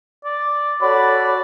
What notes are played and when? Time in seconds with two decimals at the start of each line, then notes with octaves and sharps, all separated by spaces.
0.24 D5
0.82 F#4 A4 C#5 D5 B5